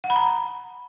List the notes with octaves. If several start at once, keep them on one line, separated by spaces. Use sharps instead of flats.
F#5
B5
A#5